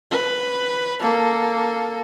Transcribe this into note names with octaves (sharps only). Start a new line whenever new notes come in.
B4
A#3 A4